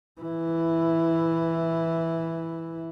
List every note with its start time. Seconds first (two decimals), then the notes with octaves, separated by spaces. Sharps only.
0.21 E3 E4